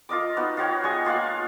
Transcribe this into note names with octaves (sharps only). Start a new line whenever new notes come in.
F4 A#4 D#5 D6
B3 D#4 F#4
F4 F#4 C#5 G5
G#3 D#5 C#6
A#3 F4 F5 F#5